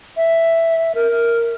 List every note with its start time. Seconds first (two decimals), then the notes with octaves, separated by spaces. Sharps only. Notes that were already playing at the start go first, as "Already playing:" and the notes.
0.17 E5
0.95 A#4